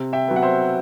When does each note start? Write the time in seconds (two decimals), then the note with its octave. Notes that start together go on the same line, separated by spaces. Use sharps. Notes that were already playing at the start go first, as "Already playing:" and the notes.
Already playing: C3
0.13 E5 G5
0.28 F#3 B3
0.36 F#5
0.42 C5 E5